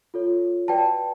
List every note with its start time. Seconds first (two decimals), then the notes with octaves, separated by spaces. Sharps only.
0.14 F4 A4 C#5
0.68 F#4 B4 D5 G5 A5